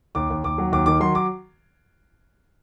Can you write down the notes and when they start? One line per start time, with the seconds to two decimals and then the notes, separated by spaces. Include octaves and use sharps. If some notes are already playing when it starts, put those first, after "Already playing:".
0.15 D#2 D6
0.30 D#2
0.44 D#2 D6
0.58 F#3
0.72 D#2 D6
0.86 D#3 D6
1.00 F#3 C6
1.15 D6